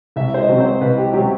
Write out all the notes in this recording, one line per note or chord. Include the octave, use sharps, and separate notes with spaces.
C2 E5
C5
D#5
C3 F#3 C4
C5
C2 B4
G4
C3 F#3 C4 G4